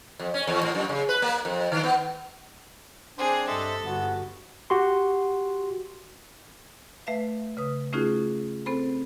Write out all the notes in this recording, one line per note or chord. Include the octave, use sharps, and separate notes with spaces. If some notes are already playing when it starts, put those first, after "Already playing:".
F2
C#4
E2
A2
F#2
C#3
B4
A#3
F2
D#3
B3
C4 D4 G#4 C5
G2 A4 C5 D#5 E5
G1 B3 F#4
F#4 G4 C6
A3 B4 E5 F5
C#3 B4 D#6
A3 C#4 D#4 F4 F#4 G#4
C4 A4 C5 B5